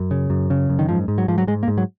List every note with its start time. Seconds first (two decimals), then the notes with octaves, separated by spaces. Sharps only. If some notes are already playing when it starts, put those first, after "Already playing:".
Already playing: F#2
0.11 C#3
0.30 F#2
0.50 C#3
0.69 F#2
0.79 D#3
0.89 G#2 F3
1.08 G#2
1.18 F#3
1.28 G#2 F3
1.38 F#3
1.47 G#2 G#3
1.63 A#3
1.68 G#2
1.78 F#3